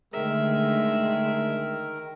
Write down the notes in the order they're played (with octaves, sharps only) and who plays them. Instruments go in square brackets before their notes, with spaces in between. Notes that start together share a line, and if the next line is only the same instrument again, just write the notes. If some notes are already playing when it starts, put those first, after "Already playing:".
[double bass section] D3 A3 [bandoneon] D#3 A#4 [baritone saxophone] G#3 [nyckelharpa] E5